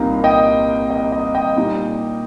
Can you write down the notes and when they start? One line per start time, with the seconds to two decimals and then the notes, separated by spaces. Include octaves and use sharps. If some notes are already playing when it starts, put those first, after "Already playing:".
Already playing: C2 A#2 A#3 D#4 F5 A#5
0.24 D#5 G5
0.90 D#5
1.12 D#5
1.35 D#5 G5
1.57 A#2 G3 D#4